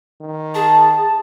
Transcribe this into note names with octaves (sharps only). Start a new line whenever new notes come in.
D#3
G#4 A5